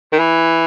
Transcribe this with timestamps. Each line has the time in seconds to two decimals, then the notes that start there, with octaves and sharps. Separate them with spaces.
0.12 D#3
0.19 E3